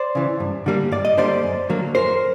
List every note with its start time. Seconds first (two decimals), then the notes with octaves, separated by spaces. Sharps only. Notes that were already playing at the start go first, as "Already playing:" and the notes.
Already playing: C5 D5
0.15 C#3 E3
0.40 G2
0.66 D3 G3 A#3
0.92 G2 D5
1.05 D#5
1.17 D3 G3 A#3 C5 D5
1.43 F#2
1.69 D3 F#3 A#3
1.95 F#2 A#4 C5